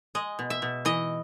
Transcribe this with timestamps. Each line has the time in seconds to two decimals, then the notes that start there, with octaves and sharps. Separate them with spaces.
0.15 G#3 D#5
0.39 B2
0.50 E5
0.62 B2
0.85 E3 D#5